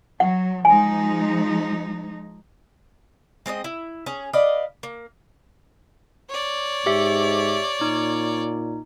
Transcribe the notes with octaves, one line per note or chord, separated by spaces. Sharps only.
F#3 F#5
F3 G#3 D#4 G#5
G#3 C4 D5 D#5
E4
C#4 G#4
B4 D5 D#5 F5
A#3
C#5 D5
G#2 G4 E5
A#2 D#4